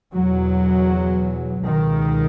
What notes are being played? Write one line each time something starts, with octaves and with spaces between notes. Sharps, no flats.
E2 B2 F#3
C#2 B2 D#3